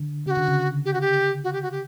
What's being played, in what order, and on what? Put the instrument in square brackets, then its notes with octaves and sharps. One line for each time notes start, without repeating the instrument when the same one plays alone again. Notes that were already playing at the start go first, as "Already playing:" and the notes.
Already playing: [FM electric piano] D3
[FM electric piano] C#3 [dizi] G4
[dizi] F#4
[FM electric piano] D3
C#3
[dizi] G4
F#4
G4
F#4
G4
F#4
G4